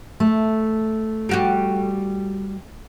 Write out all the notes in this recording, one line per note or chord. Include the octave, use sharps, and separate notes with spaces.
A3
G3 F#4 G4